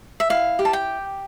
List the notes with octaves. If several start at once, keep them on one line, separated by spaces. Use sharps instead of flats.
E5
E4 F5
G4
A5
G5